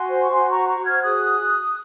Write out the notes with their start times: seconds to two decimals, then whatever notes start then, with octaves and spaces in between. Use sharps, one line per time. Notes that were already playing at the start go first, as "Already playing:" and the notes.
Already playing: F#4 G#5 C6
0.08 C5
0.22 C#6
0.32 F#4 G#5 C6
0.50 A#5 C#6
0.56 C5
0.68 A#5 C#6
0.80 F#4
0.85 F6 G#6
1.03 G#4 D#6 F#6